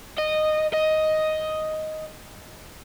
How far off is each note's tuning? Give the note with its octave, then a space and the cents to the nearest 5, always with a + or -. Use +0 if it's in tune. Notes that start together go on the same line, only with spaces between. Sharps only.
D#5 -15
D#5 +5